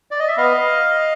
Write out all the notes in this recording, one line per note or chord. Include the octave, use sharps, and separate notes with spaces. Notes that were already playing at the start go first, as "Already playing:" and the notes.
D5
D#5
E5
B3 D#5 F5